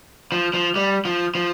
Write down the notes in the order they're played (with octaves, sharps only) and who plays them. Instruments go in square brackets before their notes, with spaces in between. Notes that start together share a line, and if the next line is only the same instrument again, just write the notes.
[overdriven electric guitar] F3
F3
G3
F3
F3